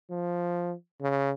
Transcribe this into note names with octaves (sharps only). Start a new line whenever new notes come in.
F3
C#3